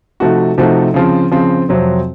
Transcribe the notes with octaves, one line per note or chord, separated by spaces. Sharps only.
C3 F3 A3 D#4 F#4
C3 F3 A3 D#4 F#4
C#3 F3 C4
C#3 F3 C4
F2 C3 F#3 C4